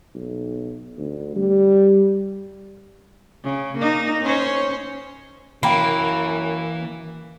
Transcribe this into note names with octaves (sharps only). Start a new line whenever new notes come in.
B1
D2
G3
C#3
A#3 D#4
C#4 C5 C#5
F#2 E3 A#3 G5 B5